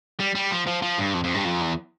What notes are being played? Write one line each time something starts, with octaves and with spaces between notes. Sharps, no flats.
G3
G3
F3
F3
F3
G2
F2
F2
G2
F2
E2